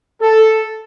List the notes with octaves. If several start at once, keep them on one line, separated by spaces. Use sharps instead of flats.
A4